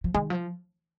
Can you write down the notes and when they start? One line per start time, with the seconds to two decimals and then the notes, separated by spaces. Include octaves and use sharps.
0.04 F3
0.14 D#3 G#3
0.30 F3